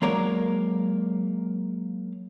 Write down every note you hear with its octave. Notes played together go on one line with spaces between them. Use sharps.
F#3 G#3 A#3 A#4 C#5 D5